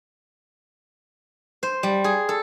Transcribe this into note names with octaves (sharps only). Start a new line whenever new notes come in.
C5
G3
G#4
A4